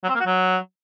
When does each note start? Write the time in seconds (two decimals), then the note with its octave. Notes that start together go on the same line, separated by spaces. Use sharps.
0.03 F#3
0.09 C4
0.15 A#3
0.20 F#4
0.26 F#3